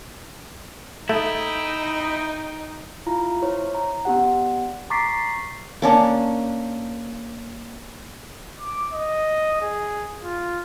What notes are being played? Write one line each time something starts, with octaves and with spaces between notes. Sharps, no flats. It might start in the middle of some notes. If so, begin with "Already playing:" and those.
A3 D#4 E4 G5 D#6
E4 F4 A#5
E4 C5 C#5
A#5
B3 D4 G4 F#5
A#5 C#6 D6 A6 B6 C7
A#3 C#4 D4
D6
D#5
G#4
F4